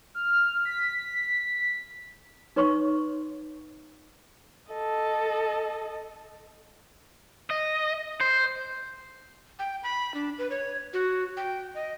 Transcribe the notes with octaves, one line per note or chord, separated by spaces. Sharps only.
F6
B6
D#4 B4 C#5 C6 C#6
A4 D#5
D#5
C5
G5
B5
D4
B4
C#5
F#4
G5
D#5